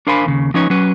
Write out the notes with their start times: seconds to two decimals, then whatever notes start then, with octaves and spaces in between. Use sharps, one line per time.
0.07 D4 A#4 C5 F5 G#5 B5
0.26 D#2 C#3
0.54 F3 C#4 D#4 B4 C#5
0.70 F#3 C#4 B4